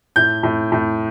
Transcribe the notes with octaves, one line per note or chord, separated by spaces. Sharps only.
A2 G6
A2
A2